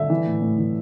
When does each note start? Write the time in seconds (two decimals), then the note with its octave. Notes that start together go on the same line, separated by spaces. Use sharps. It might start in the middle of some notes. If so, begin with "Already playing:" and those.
Already playing: D3 E5
0.10 E3
0.27 A2
0.42 A2
0.58 E3